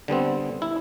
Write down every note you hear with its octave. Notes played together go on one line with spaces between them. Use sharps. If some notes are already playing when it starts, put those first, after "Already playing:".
D3 G3 B3 C4
E4